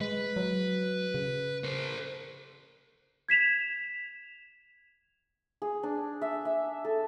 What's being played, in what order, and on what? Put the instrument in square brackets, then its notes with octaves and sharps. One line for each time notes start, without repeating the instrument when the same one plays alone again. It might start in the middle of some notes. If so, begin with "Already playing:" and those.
[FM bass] G#3 [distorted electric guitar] B4
[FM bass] F#3
C#3
[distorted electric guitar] A#4 C5
[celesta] G#6 B6 E7 F7
[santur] G#4
D4
E5
E5
A4